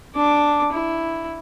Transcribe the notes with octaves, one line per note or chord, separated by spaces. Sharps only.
D4 D6
E4